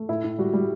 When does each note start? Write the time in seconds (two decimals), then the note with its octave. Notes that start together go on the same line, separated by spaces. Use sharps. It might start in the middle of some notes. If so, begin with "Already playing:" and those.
Already playing: A3
0.08 A2 E4
0.24 A2
0.38 G3 F#4
0.53 G3